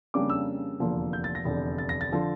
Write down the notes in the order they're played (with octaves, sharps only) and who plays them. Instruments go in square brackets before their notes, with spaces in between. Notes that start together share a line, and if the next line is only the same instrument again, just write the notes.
[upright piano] F2 C#3 G3 A#3 D4 D6
E6
F1 E2 D3 F3 A#3
G6
A6
A#6
F1 E2 D3
A6
A#6
A6
D3 F3